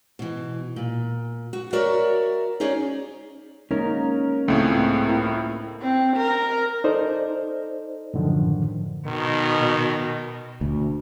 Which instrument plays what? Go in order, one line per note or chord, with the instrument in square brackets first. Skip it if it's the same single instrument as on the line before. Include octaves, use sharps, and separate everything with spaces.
[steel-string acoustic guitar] B2 E3
A#2
F#4
F#4 A#4 C#5 D5 E5
C#4 D#4 G#4 C#5 D5
[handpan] G#3 A#3 D#4 [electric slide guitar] C#4 A#4
[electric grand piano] C#2 A2 [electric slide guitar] A3 C4 G#4 [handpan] A#3
[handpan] A#3 E4 A#4
[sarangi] C4
A#4
[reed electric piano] D#4 A4 C5 D5 D#5
F#2 A2 D3 D#3 F3
[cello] B2 [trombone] D#3
[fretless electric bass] D2